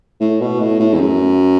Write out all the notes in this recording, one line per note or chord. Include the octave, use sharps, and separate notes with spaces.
A2
B2
A2
A2
E2
F#2